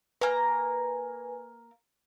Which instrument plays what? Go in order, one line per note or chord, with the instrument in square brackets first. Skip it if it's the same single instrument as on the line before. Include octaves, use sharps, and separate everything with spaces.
[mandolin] A#3 A#5 [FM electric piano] B4 G#5